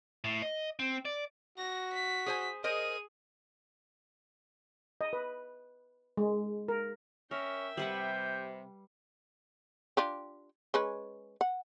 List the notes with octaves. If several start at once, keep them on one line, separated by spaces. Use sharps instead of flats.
A2
D#5
C4
D5
F#4 A#6
B6
G#4 C5 G#5
G#4 A#4 C5 D#5 D#7
D#5
B4
G#3
A#4
C#4 A#4 E5 G5
C3 G3 B4 F#5 G6
D4 F4 G4
G#3 C#4 B4
F#5